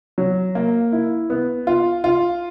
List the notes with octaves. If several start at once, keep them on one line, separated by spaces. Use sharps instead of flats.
F#3
A#3
E4
B3
F4
F4